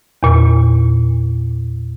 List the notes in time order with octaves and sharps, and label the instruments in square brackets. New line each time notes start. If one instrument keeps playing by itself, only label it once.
[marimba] E2 A#2